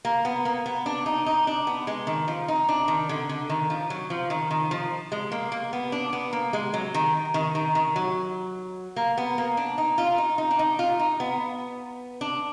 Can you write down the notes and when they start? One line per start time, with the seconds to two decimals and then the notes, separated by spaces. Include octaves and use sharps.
0.05 A#3
0.25 B3
0.45 A#3
0.66 B3
0.86 D4
1.06 D#4
1.26 D#4
1.47 D4
1.67 B3
1.87 G#3
2.07 D#3
2.28 F3
2.48 D#4
2.69 D4
2.88 D#3
3.09 D3
3.29 D3
3.50 D#3
3.70 F3
3.90 F#3
4.10 F3
4.30 D#3
4.51 D#3
4.71 F3
5.12 G#3
5.32 A#3
5.52 A#3
5.73 B3
5.92 D4
6.13 B3
6.33 A#3
6.53 G#3
6.74 F#3
6.94 D#3
7.34 D#3
7.55 D#3
7.75 D#3
7.96 F#3
8.96 A#3
9.18 B3
9.38 A#3
9.57 D4
9.78 D#4
9.98 F4
10.18 D#4
10.38 D#4
10.51 D4
10.59 D#4
10.79 F4
10.99 D#4
11.20 B3
12.21 D4